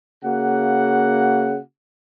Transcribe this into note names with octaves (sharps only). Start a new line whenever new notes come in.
C#3 A#3 F#4 F#5